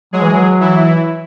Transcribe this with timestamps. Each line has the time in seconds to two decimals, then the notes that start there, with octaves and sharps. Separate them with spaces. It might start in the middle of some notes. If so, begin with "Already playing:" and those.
0.13 F#3 G#3 G#4
0.22 E3
0.30 F#3
0.60 E3 E4